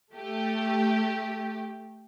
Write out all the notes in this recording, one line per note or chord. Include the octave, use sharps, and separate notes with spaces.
A3 G4